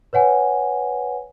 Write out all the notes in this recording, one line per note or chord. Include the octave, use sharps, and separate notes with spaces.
B4 C#5 F#5 G#5